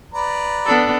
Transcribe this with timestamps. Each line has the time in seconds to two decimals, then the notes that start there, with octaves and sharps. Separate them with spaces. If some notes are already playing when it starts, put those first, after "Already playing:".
0.14 B4 D5 A#5
0.66 B3 D4 A4